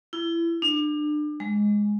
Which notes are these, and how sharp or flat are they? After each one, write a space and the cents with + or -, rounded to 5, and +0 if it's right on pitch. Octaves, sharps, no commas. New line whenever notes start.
E4 +25
D4 +30
G#3 +0